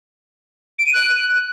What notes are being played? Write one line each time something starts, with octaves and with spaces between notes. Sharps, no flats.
D7
D#7
F#6